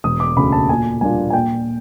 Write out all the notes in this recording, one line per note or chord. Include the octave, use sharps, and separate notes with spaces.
E1 D#6
D6
D2 C#3 B5
A5
A#2 G#5
G3 A#3 D4 F4 G#5
G#5
A#2 G5